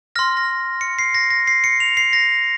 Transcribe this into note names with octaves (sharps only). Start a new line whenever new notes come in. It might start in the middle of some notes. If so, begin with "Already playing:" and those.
C6 F6 A#6
A#6
C#7
C7
A#6
A#6
C7
C#7
F7
C7
A#6